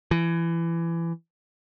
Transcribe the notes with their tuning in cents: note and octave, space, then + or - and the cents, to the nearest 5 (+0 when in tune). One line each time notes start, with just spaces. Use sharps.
E3 +25